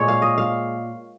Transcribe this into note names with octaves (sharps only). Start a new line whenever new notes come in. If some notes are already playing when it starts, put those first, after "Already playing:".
Already playing: A#2 G#3 C#5
F5
D#5
F5